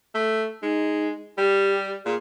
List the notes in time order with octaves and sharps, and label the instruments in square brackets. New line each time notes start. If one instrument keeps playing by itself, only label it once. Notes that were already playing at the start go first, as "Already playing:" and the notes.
[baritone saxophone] A3
[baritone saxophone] G#3 [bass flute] D#4
[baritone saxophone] G3 [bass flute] G4
[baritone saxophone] A#2 [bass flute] G#4